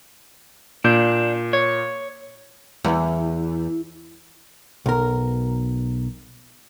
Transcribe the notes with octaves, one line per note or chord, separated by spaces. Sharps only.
A#2 D4 G6
C#5
E2
B1 A#4